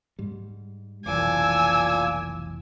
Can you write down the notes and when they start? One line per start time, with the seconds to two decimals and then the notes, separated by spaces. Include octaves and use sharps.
0.19 G#2 G3
1.06 F1 B1 A#2 E3 F3 G#5 D6 E6